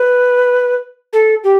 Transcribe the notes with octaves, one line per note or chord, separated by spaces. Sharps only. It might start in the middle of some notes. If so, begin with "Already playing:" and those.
Already playing: B4
A4
G4